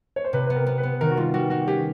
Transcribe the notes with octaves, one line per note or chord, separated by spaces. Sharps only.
C#5
C5
C3 B4
B3 B4
A#4
B3
B4
B3
D#3 A#4
F#4
G3 F4
G3 F#4
G3 F#4
C#4 G4